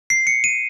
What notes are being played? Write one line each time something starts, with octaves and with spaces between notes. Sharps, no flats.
C7
C#7
D#7